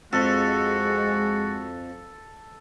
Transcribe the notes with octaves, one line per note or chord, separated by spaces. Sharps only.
F2 G#3 F#4 A4